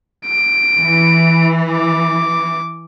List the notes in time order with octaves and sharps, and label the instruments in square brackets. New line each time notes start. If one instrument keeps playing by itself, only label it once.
[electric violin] D7
[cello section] E3
[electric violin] D6